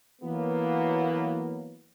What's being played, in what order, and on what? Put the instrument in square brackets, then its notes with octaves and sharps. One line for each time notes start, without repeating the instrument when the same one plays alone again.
[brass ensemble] E3 F#3 A#3 B3